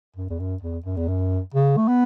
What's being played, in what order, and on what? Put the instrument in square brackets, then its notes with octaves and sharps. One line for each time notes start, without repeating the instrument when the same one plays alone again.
[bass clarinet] F#2
E2
F#2
E2
F#2
E2
F#2
C#3
A3
B3